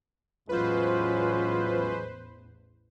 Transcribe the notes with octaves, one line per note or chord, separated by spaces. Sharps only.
A1 E2 F#3 G#3 C#4 F4 B4 C5